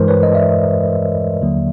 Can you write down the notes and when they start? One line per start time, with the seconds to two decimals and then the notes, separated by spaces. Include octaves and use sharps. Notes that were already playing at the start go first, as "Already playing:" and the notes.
Already playing: G2 E3 G#3 A#4 C5
0.08 B4 C#5
0.23 D#5
0.34 D5 E5
1.42 D#2 D3 F#3 A#3